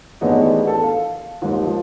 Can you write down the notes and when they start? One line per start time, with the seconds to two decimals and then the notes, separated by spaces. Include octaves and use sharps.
0.21 A1 D#3 B3 D4 G#4 D#5
0.67 A4 A5
0.83 F5
1.42 D#2 G#2
1.67 F3